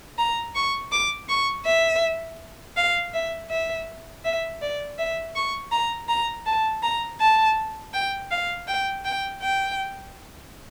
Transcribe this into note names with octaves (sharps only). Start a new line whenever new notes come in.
A#5
C#6
D6
C#6
E5
F5
E5
E5
E5
D5
E5
C#6
A#5
A#5
A5
A#5
A5
G5
F5
G5
G5
G5